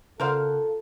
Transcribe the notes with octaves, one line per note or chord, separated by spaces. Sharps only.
C#3 F4 A4 A#4 C5 D5 F5 F#5